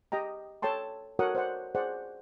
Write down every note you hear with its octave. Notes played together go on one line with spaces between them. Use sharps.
G4 D#5 G5 A#5
A4 C#5 G5 A5 C6
F#4 A4 A#4 C#5 F#5 D#6
C5 D5 F#5
G#4 C5 D5 F#5